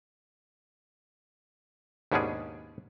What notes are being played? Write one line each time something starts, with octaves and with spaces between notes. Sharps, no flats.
D#2 G#2 B2 C#4 D4 G#4